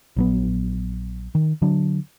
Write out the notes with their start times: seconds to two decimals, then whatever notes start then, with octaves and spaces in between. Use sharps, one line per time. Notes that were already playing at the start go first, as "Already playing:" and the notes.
0.16 A#1 F#3 B3
1.35 D#3
1.62 D3 F#3 D4